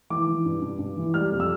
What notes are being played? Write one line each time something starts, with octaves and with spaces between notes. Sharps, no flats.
E3 D6
E3
G2
G2
G2
E3
G3 F6
F2
E6